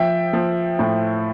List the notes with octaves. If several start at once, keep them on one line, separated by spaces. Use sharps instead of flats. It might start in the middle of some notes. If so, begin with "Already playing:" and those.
Already playing: F3 E5 G5
F3
A2